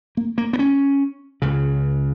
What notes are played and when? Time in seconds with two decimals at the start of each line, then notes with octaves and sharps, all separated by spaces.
0.17 A#3
0.38 A#3
0.53 B3
0.59 C#4
1.42 C#2 C#3